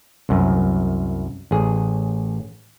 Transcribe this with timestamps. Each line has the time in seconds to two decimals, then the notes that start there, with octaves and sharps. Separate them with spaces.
0.29 C2 F#2
1.51 A1 G#4